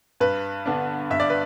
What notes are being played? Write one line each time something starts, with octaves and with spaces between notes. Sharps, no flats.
G2 B4
D3 B3 D4
G2 E5
D5
B4